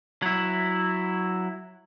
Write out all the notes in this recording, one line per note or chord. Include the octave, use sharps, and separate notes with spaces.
F#3 E4